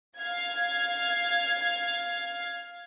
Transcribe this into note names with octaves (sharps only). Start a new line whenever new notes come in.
F5 G#6